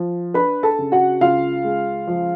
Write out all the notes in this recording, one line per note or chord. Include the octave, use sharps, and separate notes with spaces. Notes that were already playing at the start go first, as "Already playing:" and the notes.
Already playing: F3
D4 B4 B5
A4 A5
C#3
F#4 F#5
C#2 F4 F5
G#3
F3